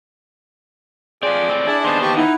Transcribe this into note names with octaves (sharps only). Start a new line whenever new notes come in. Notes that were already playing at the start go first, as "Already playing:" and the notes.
F3 C4 G#4 D5
A2 C4
D4 E4 G#4 A5
D#2 B3 C5 C6
G4 A5 C#6
D#4 E4 F#5